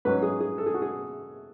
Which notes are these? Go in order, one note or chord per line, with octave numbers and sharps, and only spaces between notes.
G#2 F#3 C#4 B4
G#4
G#4
A4
G#4
F#4
G#4